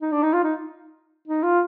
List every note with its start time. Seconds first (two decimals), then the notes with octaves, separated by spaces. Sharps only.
0.02 D#4
0.12 D4
0.23 D#4
0.34 F4
0.44 D#4
1.28 D#4
1.43 F4